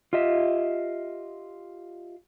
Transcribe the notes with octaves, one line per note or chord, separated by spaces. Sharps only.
F4 G4 D#5 E5